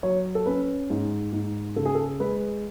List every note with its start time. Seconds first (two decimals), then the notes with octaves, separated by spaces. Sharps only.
0.03 F#3 C#5
0.35 A4
0.46 C#4 B4
0.90 G#2
1.32 G#2
1.76 C#3 A4
1.85 G#4
1.95 A4
2.20 G#3 B4